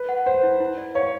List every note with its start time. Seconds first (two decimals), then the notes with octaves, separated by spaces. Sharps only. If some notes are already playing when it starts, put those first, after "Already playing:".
Already playing: B4
0.09 F#5
0.26 C5 F#5
0.43 E4
0.60 E4
0.78 D5
0.95 C#5 F5